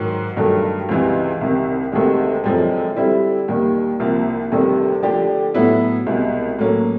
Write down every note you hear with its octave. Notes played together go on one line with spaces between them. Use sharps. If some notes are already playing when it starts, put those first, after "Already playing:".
Already playing: G#2 D#3 F#3
G2 D#3 F#3 A3
C#2 C3 E3 G#3
C2 C3 D#3
D2 C3 D#3 G#3
F#2 D3 F3 G#3 C4
D3 G3 C4 E4
D#2 D#3 G3
C2 C3 F3 A#3
D2 C3 D#3 G3
D3 F3 A3 D4 G4
A2 F#3 B3 E4
C2 B2 G#3
A2 F#3 A#3 C#4